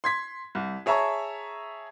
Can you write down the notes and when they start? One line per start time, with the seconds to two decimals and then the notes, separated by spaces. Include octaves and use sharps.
0.04 C6 G#6 B6
0.55 C2
0.86 G#4 C#5 E5 A5 A#5 C#6